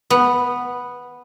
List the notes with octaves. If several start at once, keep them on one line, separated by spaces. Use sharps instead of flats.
B3